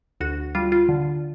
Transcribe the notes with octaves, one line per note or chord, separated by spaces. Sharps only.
D2 F#4
G3 F4
F4
D3